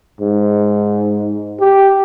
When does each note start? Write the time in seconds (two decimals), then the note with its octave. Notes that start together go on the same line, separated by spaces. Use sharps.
0.21 G#2
1.60 G4